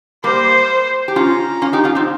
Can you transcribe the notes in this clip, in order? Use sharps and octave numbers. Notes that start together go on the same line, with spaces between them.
G3 A#3 C5
G4
C#4 F4 A#5
C#4 F4
D#4 G4
C#4 F4
C4 D#4